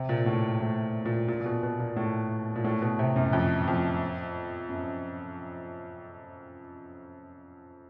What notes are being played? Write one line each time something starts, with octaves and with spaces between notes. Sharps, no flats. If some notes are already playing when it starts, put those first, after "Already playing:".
Already playing: C3
A#2
A2
A2
A#2
A#2
A#2
B2
B2
A#2
A2
A#2
A2
B2
C3
F#2
F2
F2
F#2